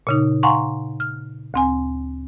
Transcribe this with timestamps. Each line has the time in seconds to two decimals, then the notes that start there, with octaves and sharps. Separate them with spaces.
0.07 A#2 C#3 D#4
0.43 F5 F#5 G#5 A#5 C6 C#6
1.00 F6
1.54 D2 C4 G#5